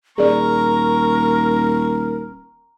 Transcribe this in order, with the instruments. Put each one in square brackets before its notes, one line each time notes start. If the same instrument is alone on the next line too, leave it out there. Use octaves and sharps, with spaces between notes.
[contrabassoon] D#1 [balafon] G#4 D5 [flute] A#4 [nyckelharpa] A#5 C#6